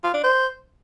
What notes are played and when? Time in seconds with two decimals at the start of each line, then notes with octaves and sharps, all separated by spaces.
0.04 F4
0.14 D4
0.24 C5